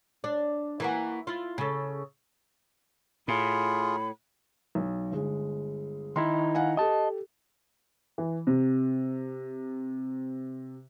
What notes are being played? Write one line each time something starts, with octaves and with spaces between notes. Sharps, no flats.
D4
E3 A#3 F#4
E4 F4
C#3 A4
A2 F4 G#4 B5
B1
G1 G#3
D#3 D#4 E4 C6
F5 F#5 G#5
G4 A4 D#5 A5
E3
C3